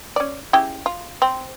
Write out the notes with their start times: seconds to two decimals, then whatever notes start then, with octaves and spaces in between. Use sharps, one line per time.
0.16 C#4 D5
0.53 C#3 E4 G4
0.86 F4
1.22 C4